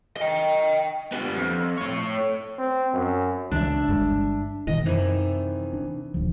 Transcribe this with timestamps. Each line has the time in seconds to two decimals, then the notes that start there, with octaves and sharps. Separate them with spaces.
0.17 D#5 G5
1.13 G3 B3
1.36 F2
1.78 A3 C#5
2.58 C4
2.93 F#2
3.51 C#2 E3 G#3 D4 E5
3.89 G1 G2 G#3
4.67 B2 D#3 E3 D#5
4.85 F#2 C3 D#3 E3
5.73 D4
6.14 D#1 D2 F3